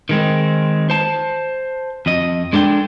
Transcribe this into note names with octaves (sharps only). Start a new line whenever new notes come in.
D#3 G#3 C4
C5 A5
F2 D#5
G#3 D4 A4 E5 G5